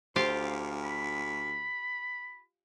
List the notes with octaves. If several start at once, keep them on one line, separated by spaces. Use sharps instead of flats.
D2 F4 G4 C5 F5
B5